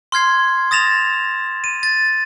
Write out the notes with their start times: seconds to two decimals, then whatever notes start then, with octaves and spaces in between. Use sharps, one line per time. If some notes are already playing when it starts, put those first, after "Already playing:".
0.12 C6 F6 G#6 C7
0.71 D#6 A6 A#6 E7 F7
1.64 D#7
1.83 A6